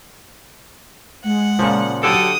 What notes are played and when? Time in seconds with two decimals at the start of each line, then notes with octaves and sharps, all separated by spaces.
1.24 G#3 F#5
1.59 A#2 C#3 F3
2.03 D3 F#3 G4 A4 D#6